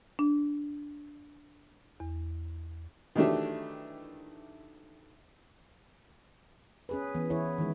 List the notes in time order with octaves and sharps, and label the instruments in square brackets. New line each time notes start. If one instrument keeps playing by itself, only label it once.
[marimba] D4
E2
[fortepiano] D#3 E3 F#3 A3 D4 G4
[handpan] C#4 G#4 B4
E3 B3
E3 E4 G#4 C#5
D#3 E3 G#3